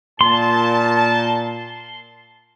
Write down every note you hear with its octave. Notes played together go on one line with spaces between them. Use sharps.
A#2 A5 C6